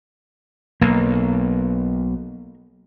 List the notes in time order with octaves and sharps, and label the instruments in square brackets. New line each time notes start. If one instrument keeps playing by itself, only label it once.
[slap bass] B1 [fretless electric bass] A#3